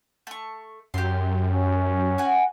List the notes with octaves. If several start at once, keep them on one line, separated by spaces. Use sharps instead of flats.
A3 C#6
F#2 G4 C6
C#4
F#4 F#5 G#5